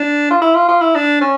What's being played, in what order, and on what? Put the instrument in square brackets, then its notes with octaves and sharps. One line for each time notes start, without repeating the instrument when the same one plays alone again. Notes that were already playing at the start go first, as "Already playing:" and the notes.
Already playing: [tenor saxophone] D4
F4
E4
F4
F4
E4
D4
C#4